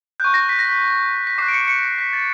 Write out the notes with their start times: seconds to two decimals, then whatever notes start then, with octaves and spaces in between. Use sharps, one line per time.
0.20 C#6 F#6 G6
0.34 A#6
0.49 B6
0.59 A#6
0.69 B6
1.27 B6
1.38 D6 F#6 C7
1.48 D7
1.53 C#7
1.68 C#7
1.83 C7
1.99 B6
2.13 A6